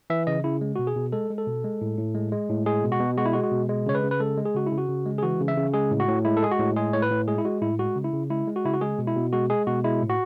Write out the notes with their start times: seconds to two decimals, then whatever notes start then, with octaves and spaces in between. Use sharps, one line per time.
0.10 E3 E5
0.27 C#3 D#5
0.44 C#3 E4
0.61 G#3
0.76 B2 F#4
0.87 G#4
0.96 B2
1.12 G#3 A4
1.30 G#3
1.38 A4
1.47 B2
1.64 G#3
1.81 A2
1.98 A2
2.15 G#3
2.32 G#3
2.49 A2
2.66 G#3 G#4
2.84 B2
2.92 F#4
3.00 B2
3.17 G#3 F#4
3.26 E4
3.33 G#3 F#4
3.43 F#4
3.52 B2
3.69 G#3
3.86 C#3 C#5
3.95 B4
4.03 C#3
4.11 B4
4.20 G#3 A4
4.37 G#3
4.45 G#4
4.55 C#3 F#4
4.67 E4
4.72 C#3
4.78 F#4
4.89 C#3
5.06 G#3
5.18 G#4
5.23 E3 F#4
5.40 C#3
5.48 E5
5.57 C#3
5.74 G#3 G#4
5.91 A2
6.00 F#4
6.08 A2
6.25 G#3 E4
6.37 A4
6.43 G#3 G#4
6.51 F#4
6.59 A2
6.76 G#3 G#4
6.93 A2 C#5
7.02 B4
7.11 A2
7.28 G#3 G#4
7.38 E4
7.45 G#3 F#4
7.62 A2 E4
7.79 G#3 F#4
7.96 C#3
8.04 E4
8.13 C#3
8.30 G#3 E4
8.47 G#3
8.56 F#4
8.65 C#3 E4
8.74 F#4
8.81 G#3 G#4
8.98 B2
9.07 E4
9.16 B2
9.33 G#3 F#4
9.50 G#3 G#4
9.67 B2 F#4
9.84 G#3 E4
10.01 A2
10.10 F#4